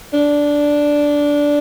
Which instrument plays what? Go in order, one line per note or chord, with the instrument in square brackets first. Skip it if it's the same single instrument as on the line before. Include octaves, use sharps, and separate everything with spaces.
[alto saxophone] D4